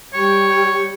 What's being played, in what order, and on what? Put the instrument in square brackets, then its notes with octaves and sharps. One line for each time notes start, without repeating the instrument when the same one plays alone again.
[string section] G3 G5 [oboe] C#5